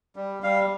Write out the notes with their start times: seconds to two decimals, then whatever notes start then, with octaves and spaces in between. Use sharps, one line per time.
0.16 G3
0.43 G3 F5